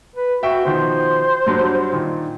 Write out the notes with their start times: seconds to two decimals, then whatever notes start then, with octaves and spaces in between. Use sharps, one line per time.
0.16 B4
0.43 F#4 E5 G5 C#6
0.65 B2 D#3 F3 C5
1.46 G2 F#3 D4
1.93 A#2 D#3